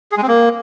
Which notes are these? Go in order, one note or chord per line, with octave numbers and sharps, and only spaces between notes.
G#4
G#3
C4
A#3